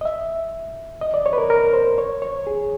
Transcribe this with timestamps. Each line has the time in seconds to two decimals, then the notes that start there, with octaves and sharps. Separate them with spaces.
0.01 D#5
0.05 E5
1.01 D#5
1.14 D5
1.26 C#5
1.33 B4
1.38 A#4
1.50 A#4
1.74 C5
1.98 C#5
2.22 C#5
2.47 G#4